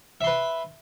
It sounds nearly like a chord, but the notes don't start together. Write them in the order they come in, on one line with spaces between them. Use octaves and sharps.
E5 C6 B4